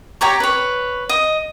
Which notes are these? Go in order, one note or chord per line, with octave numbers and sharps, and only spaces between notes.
G4 C#5 A#5 C#6
B4 C#5
D#5